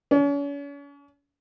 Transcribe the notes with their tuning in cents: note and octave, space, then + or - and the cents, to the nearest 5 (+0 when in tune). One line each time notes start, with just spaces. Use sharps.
C#4 +40